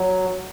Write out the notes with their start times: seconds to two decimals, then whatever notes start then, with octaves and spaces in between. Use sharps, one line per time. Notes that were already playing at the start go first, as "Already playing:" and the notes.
Already playing: F#3